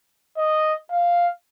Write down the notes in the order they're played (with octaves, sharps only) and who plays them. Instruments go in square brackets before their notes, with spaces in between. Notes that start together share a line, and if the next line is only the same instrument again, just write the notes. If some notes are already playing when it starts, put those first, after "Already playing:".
[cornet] D#5
F5